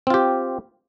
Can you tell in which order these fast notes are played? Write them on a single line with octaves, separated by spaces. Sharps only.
C4 F4 G4